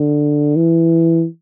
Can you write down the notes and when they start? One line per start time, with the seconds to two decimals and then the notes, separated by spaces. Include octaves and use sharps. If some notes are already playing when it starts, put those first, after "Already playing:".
Already playing: D3
0.56 E3